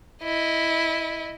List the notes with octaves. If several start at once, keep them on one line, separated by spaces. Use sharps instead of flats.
E4 D#5